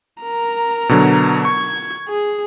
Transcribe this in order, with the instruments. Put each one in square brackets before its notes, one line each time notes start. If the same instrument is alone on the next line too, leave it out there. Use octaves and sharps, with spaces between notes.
[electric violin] A#4 A#5
[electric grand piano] B2 D3 F#3
[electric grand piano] C#6 [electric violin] G#6
[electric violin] G#4